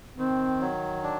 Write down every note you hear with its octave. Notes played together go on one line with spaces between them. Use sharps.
D#3 C4
F#3
D4